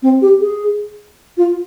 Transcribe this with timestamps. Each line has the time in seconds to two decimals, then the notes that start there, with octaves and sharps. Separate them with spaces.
0.03 C4
0.22 G4
0.41 G#4
1.37 F4